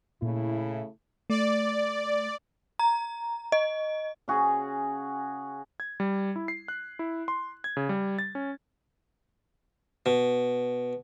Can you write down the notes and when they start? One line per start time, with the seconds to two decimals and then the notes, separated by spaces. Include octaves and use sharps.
0.22 A#2 C#3 A3 E4
1.30 A3 D5
2.79 A#5
3.52 D#5
4.28 C#3 F#4 G#4
5.80 G#6
6.00 G3
6.36 E4
6.48 C7
6.68 F#6
6.99 E4
7.28 C6
7.64 G#6
7.77 C#3
7.89 G3
8.19 A6
8.35 C#4
10.06 B2